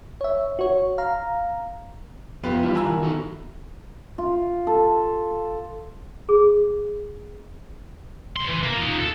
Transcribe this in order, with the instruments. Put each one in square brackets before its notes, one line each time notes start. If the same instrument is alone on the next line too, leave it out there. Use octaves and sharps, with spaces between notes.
[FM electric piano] C#5 E5
F#4 C#5
F5 A#5
[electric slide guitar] F2 G4 [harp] B3 B5 [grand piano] F4 B4
[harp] G2 E3 [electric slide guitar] E4 F4
[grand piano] G#5 A#5 E6
[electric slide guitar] D#3 [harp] F#5
[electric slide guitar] D#4 F#4 A4
[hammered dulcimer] F4
A4
[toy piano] G#4
[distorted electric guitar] C#2 C6
E3
A#3
D#4 F4
A4